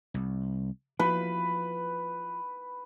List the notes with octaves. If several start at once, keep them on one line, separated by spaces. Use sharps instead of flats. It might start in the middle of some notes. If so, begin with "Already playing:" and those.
C2
F3 B4